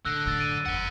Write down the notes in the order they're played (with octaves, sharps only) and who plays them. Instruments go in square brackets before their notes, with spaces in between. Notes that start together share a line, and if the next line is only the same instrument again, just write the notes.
[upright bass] A2 [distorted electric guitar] D3 [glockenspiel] E6 F#6 A#6
[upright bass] F#2 A2 [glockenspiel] E6 A6
[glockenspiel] A6 D7 D#7
[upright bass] F#1 E2 [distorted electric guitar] A#4 F#5